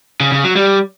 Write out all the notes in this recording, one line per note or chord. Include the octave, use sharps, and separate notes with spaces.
C#3
C#3
F#3
G3